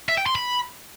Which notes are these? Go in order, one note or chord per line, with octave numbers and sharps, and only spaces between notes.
E5
G5
C6
B5